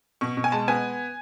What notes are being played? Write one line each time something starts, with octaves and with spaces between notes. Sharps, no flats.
B2 C#6
B2
G#5
G#3 A5
B3 G#5